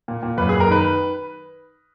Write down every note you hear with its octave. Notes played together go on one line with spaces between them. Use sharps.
A#2
A#2
F#2 B4
G#4
F#2
A#4
D#3 B4